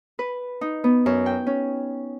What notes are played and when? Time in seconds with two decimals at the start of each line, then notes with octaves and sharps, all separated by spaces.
0.19 B4
0.61 D#4
0.84 B3
1.06 F#2
1.26 G5
1.47 C#4